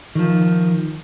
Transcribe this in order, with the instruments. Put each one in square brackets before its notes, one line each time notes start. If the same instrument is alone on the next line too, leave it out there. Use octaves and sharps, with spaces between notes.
[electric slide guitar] D#3 F3